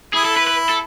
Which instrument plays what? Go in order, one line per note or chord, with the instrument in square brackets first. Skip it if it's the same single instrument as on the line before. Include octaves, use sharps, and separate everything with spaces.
[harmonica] E4 [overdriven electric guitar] G#4
[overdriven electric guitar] A4
B4
B4
A4